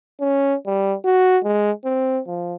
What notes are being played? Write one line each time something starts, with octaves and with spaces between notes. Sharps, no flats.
C#4
G3
F#4
G#3
C4
F3